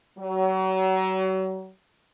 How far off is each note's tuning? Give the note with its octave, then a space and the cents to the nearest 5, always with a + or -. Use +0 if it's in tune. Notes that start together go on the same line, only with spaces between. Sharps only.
F#3 +35